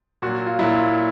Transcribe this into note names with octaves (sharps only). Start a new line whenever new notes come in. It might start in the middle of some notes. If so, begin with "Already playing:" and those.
A#2 F#3 F#4
F4
A#2 F#3 E4